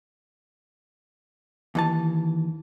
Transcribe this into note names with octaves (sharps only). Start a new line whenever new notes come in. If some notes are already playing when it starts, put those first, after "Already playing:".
D#2 E3 A5